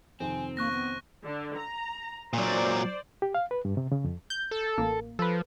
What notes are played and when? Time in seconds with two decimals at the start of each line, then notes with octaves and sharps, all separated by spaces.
0.20 F2 C3 D#3 C4 G#5
0.57 A#3 C#6 F#6 A#6
0.71 B3
1.25 D3
1.57 A#5
2.33 A#2 F#3 C5 D5
3.22 G4
3.35 F5
3.51 B4
3.65 G2
3.77 C3
3.92 C#3
4.04 F2
4.30 G6
4.51 A4
4.78 A1 A#3
5.19 F3 A4 B4